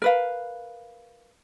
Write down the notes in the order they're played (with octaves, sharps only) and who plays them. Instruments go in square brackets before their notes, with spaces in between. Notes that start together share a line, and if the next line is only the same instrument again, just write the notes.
[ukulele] A#4 B4 F5